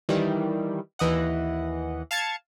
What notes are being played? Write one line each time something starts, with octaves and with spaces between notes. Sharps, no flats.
D#3 E3 G3
D#2 E3 D#5 F#5
F5 A5 G#6 A6 C#7